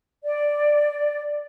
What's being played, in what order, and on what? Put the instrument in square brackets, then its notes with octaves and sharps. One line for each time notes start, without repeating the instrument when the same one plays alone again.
[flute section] D5